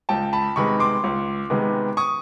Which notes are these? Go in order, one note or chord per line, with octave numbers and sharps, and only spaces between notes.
C#2 G5 A5
A5 B5
C3 D#3 G#3 B3 B5 C#6
C6 D6
C#2
C3 D#3 G#3 B3
C#6 D#6